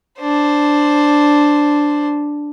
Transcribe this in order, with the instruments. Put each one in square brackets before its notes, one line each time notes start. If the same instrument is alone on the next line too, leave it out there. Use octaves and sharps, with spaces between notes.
[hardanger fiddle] D4 C5